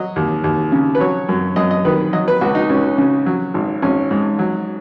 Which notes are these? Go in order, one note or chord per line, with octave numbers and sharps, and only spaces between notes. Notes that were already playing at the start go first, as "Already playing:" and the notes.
Already playing: F#3 D#5
D#2
D#2
C#3
B4
F#3 C#5
F#2
F#2 D#5
D#5
D#3 B4
F#3 D#5
B4
C#2 F#4
D#4
C#2 C#4
C#3
F#3
G#1
G#1 C#4
G#2
F#3